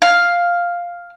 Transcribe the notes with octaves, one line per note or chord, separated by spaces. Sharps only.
F5